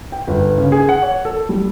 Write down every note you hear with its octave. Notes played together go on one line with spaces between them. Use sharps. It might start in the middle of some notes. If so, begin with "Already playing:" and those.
G5
G1
C#3
G#4
F#5
C#5
A4
G3